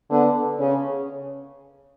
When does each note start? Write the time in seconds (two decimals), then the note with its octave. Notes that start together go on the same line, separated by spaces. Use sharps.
0.10 D3 B3
0.60 C#3 C#4